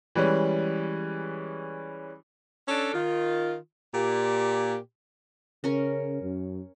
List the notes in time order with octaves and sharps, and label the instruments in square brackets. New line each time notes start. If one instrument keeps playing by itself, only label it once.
[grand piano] E3 G3 G#3 C#4
[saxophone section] C#4 D4 A4
D#3 F4
A#2 G4
[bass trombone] C#3 [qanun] C#4 A#4
[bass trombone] F#2